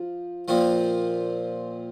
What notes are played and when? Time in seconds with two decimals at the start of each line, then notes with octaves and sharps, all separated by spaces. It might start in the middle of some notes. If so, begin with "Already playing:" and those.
Already playing: F3 F4
0.48 A#2 F3 C4 F4